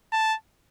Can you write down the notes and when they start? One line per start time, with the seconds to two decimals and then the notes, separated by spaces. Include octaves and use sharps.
0.13 A5